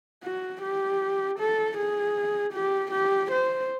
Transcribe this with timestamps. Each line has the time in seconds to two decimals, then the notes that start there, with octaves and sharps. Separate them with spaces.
0.24 F#4
0.62 G4
1.39 A4
1.77 G#4
2.53 G4
2.91 G4
3.31 C5